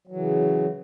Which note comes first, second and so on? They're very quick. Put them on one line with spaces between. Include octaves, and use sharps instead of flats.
F#3 E3 C#3